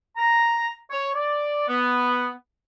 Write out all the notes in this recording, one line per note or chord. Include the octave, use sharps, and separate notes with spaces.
A#5
C#5
D5
B3